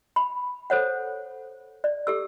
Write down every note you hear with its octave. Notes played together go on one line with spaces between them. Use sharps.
B5
A4 C5 C#5 F#5
D5
G4 A4 E6